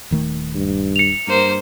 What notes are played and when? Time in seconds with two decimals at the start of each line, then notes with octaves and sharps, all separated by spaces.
0.11 D#1 D#3 A3
0.55 G2
0.96 C#7 F7
1.27 G2 A#3 C5